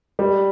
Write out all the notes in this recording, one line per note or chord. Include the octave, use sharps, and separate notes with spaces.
G3